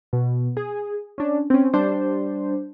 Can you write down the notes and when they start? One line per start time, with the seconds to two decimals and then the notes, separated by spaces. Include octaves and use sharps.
0.13 B2
0.57 G#4
1.18 C#4 D4
1.50 C4 C#4
1.74 G3 D4 C5